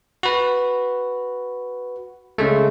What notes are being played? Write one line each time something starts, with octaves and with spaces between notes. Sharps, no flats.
F#4 B4
C#3 G#3 A3